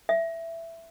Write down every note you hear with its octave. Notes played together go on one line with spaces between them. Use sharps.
E5